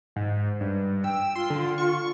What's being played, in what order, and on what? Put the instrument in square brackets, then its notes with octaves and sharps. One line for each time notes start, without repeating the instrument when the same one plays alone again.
[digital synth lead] G#2
G2
[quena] G5 [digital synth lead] E6
[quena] F4 [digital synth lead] C6
[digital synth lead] D3
C#6